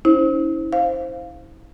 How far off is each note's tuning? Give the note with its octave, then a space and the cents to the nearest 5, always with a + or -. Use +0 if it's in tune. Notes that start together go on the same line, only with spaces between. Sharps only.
C#4 +25 E4 -25 C5 +10
C5 +5 F5 +0